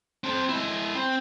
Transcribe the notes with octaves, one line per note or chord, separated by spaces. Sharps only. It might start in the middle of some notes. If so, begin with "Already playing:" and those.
C4 A5
G#3 E4
C4